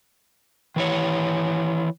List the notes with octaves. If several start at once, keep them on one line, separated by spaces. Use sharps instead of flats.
D#3 E3 C#5